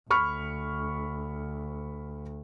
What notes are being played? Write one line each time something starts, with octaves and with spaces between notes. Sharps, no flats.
D2 B5 C#6 F6